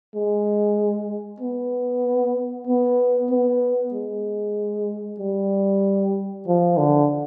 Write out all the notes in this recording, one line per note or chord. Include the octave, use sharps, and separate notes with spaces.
G#3
B3
B3
B3
G#3
G3
F3
D3